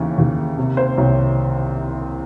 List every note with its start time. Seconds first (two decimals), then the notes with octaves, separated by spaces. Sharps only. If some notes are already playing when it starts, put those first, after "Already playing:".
Already playing: D#2 C#3 E3
0.18 D#2
0.57 C3
0.77 C5
0.98 C2 C#5